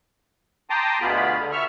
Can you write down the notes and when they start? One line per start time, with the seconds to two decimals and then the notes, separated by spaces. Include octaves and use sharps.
0.70 G5 A5 A#5 C6 D6 D#6
1.01 D2 B2 B3 F4 G#4 B5
1.37 D3
1.52 E5 C#6 F6